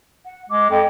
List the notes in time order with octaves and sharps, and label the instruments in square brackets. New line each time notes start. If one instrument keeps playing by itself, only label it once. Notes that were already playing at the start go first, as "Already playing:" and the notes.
[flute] F#5
[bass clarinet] G#3 [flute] D6
[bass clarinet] F2 [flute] G5